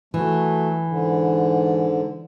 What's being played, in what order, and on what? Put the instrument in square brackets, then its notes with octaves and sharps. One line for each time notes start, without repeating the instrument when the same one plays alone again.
[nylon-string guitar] E3 [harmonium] F#3 A3
[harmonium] G#2 D3